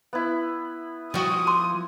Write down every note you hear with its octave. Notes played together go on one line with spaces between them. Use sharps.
B3 E4
F3 F#4 D#6
C6 D6